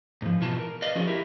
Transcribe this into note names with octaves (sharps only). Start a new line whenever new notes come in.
G#2 F3
B2 E3 F4 A5
A#4
B4 D5 D#5 F5
F3 C#4 F#4 G#4 D5 D#5
E4 G4 A#4 E5